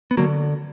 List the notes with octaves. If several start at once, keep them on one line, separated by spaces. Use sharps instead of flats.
B3
D3 F#3 A#3